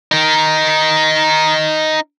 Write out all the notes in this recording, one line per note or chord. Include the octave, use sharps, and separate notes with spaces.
D#4 A#4